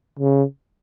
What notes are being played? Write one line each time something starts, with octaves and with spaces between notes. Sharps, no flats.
C#3